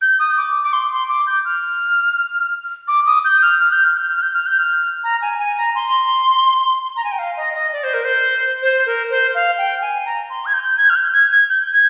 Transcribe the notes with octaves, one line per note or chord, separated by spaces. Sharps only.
G6
D#6
D6
D6
C6
C6
D6
G6
F6
D6
D#6
G6
F6
F6
G6
F6
G6
F6
G6
F6
G6
F6
A#5
G#5
G#5
A#5
C6
A#5
G#5
G5
F5
D#5
D#5
D5
C5
A#4
C5
C5
A#4
C5
F5
G5
G#5
A#5
C6
G#6
G6
G#6
F6
G6
G#6
G#6
G6
G#6